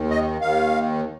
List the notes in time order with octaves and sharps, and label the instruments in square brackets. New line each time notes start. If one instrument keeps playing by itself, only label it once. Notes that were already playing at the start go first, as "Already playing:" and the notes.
Already playing: [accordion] D#2 D#3
D#5
D#2 D#3 F5